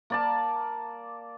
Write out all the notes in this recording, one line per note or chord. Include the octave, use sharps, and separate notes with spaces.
A#3 D5 A5